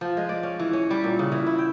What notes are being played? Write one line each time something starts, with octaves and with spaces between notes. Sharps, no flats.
F3
G#3
D5
C#4
E3
C#4
G3
A#2
C#3
E3
E4
G5